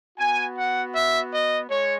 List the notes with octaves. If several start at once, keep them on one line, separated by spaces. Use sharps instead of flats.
B3 F#4 G#5
F#5
E5
D#5
G#3 C#5